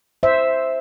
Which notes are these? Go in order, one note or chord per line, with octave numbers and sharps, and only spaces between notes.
C5 E5